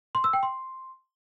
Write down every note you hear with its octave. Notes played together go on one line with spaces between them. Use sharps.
C6
E6
G5
C6